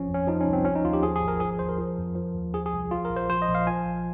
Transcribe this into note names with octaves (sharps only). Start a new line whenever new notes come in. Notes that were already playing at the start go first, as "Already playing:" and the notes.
Already playing: G#1 F3 C#4
F2
C#4
F3 D#4
C#4
C2
C4
F3 C#4
D#4
D#2 F4
G4
F3 G#4
G#4
G#1
A#4
F3 G#4
D#2 C5
A#4
F3
F2
F3
D#2
F3 G#4
G#4
C2
F3 F4
A#4
A#1
C5
F3 C5
D#5
A#1
F5
F3 G#5
A#1